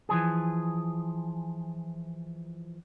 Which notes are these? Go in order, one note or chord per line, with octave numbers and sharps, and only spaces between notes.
E3 F3 G#4